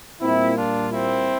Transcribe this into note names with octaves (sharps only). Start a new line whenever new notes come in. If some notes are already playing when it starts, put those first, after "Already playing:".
A#2 G3 A#3 C4 E4
D4 F4
C4 E4